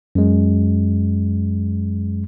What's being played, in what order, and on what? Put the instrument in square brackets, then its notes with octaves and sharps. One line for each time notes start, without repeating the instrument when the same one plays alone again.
[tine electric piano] F#2 G#3